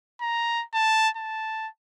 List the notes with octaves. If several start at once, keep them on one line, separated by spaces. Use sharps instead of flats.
A#5
A5
A5